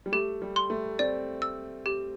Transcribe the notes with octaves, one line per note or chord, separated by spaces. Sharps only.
G3
A3 G4
G3
C6
A3
C4 D5
E6
G4